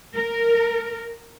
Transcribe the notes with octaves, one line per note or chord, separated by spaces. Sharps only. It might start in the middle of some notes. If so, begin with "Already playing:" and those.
A#4